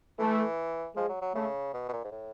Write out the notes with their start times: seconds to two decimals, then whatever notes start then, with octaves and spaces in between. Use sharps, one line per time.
0.19 E3 A3
0.95 F3 G#3
1.09 F#3
1.21 F#3
1.34 C#3 A3
1.74 B2
1.89 B2
1.93 A#2
2.04 G#2
2.12 A2